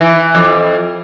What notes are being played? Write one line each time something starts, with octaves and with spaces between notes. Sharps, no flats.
E3
F2